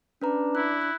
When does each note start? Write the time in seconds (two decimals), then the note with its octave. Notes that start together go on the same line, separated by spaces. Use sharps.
0.21 C#4 D4 B4 A#5
0.55 E4 F#6
0.82 F#6